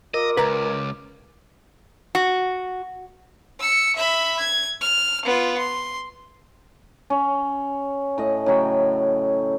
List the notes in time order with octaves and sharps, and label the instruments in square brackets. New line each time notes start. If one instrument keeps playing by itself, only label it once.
[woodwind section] F4 D6 [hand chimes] A#4 [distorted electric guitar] D#5
[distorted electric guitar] C#2 [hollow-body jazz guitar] B4 A#5
[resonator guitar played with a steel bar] F#4
[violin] E6 C#7
E5 B5
G#6
F6
B3 F4
C6
[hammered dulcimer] C#4
A2 D#5
A2 C#3 F#3 G5